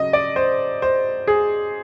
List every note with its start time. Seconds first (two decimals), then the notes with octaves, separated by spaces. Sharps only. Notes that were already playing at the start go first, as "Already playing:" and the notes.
Already playing: C#3 F#3 D#5
0.13 D5
0.36 C5
0.82 C5
1.27 G#4